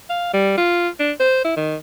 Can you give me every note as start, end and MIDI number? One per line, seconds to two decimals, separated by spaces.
0.10 0.33 77
0.33 0.54 55
0.58 0.88 65
1.00 1.12 62
1.20 1.41 72
1.45 1.53 64
1.57 1.76 51